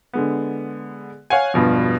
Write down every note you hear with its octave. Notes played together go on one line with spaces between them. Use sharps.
D3 G#3 B3
C#5 F5 F#5 G#5
E1 G2 B2 F3